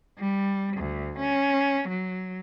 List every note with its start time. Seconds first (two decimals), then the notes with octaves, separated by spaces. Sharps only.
0.18 G3
0.77 D2
1.19 C#4
1.89 F#3